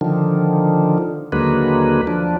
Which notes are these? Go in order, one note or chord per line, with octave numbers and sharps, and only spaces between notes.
D3 D#3 F3
D#2 D3 F#3 G#3 A#3 B4
F3 D4